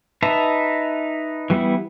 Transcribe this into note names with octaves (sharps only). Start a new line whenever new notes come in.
D#4 B4 E5 A5 A#5
E3 G3 B3 E4